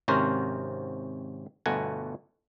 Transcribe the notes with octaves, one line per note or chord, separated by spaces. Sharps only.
G#1 C3 C#4 F#4 A#4 C5
G1 B2 A3 F#5 G#5 A#5